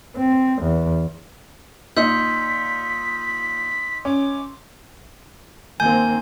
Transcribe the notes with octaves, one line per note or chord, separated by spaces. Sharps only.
C4
E2
A#2 D#4 C6 E6 G6 B6
C#4 D6
D#3 A#3 C4 G#5 G6